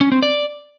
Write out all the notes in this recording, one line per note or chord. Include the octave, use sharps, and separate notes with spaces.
C#4
C4
D5